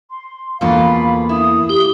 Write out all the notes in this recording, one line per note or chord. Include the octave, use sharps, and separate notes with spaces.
C6
E2 G#2 B2 A#3 F4 A4 F5 B5
E4 D#6
G4